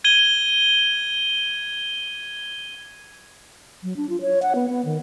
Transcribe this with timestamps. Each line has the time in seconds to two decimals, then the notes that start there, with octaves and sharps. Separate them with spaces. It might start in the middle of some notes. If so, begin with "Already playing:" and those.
0.04 G#6 D#7 G7
3.83 F#3
3.97 D4
4.09 F4
4.21 C#5
4.42 F#5
4.55 B3
4.69 B3
4.85 D#3